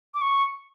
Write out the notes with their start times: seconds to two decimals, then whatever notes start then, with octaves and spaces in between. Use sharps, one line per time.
0.14 D6
0.21 C#6